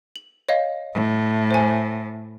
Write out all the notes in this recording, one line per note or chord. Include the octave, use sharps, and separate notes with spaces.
F#7
C#5 D#5 F5
A2
C5 G#5